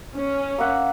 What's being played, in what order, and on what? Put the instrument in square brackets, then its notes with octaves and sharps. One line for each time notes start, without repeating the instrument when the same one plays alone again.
[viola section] C#4
[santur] A#3 E5 F#5